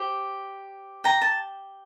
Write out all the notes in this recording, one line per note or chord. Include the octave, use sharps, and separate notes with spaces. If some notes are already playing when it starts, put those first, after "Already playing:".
Already playing: G4 C5
G5 A#5
A5